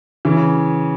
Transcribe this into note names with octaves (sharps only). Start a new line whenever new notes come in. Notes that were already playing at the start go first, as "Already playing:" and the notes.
C#3 E3